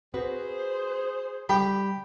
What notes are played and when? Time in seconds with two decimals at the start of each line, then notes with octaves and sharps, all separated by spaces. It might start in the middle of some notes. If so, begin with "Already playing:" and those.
0.14 C4 F#4 G#4 B4 C5
1.49 G3 G4 B5